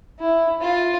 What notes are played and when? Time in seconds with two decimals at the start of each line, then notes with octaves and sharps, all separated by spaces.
0.19 E4
0.61 F4